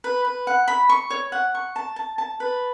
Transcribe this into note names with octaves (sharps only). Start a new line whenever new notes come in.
B4
B4
F#5
B5
C#6
C#5
F#5
C#6
A5
A5
A5
B4